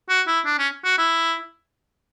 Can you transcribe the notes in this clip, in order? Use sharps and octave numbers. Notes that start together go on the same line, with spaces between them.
F#4
E4
D4
C#4
F#4
E4